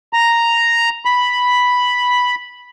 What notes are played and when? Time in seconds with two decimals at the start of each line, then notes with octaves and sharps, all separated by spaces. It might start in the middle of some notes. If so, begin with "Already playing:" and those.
0.13 A#5
1.05 B5